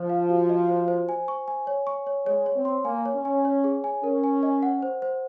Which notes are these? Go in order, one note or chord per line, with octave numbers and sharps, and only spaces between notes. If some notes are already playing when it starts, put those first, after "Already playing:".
Already playing: F3 C5
F5
F#4
D#5
C5
C5
G#5
C#6
G#5
C#5
C#6
C#5
G#3 C#5
C#5
C4
C6
A#3 G#5
C#5
C#4
G#5
C#5
G#4
G#5
C#4 A#4
G#5
D#5
F#5
C5
C5